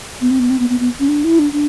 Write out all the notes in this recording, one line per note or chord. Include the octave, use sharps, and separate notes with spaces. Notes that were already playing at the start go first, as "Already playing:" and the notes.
B3
C4
B3
C4
B3
B3
B3
C#4
D4
E4
D4
D4